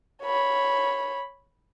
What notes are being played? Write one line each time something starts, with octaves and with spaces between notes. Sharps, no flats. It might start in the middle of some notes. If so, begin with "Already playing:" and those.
C#5 B5